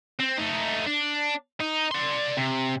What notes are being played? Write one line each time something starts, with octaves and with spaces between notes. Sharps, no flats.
C4
A3 D#4
D4
D#4
D5 C6
C3